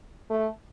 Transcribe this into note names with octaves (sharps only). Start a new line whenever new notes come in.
A3